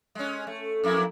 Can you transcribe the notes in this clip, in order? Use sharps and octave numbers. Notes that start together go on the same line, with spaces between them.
G#3 C#4
A3
F2 A#3 E4